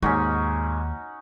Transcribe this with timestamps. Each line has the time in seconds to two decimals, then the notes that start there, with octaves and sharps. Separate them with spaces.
0.02 D#2 G#2 C#4 D#4 F#4 G#5